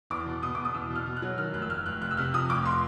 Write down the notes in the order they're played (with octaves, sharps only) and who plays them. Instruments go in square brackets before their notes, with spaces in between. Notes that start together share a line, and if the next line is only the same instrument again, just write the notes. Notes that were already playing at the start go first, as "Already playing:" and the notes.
[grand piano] E2 [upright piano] D6
[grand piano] B2
[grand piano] B2 [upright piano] D#6
[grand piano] B2 [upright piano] D6
[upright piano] D#6
[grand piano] E2 [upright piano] E6
[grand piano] B2
[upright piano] F6
[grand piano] B2
[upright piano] F#6
[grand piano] F#3
[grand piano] D#3 [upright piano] F6
[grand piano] F1 [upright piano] F#6
[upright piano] E6
[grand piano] F1 [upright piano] F6
[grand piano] F1 [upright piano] F#6
[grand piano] C3 [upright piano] F#6
[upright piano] E6
[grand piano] C3 [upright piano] F6
[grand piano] F2 [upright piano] D#6
[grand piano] F1 [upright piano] D6
[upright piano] C6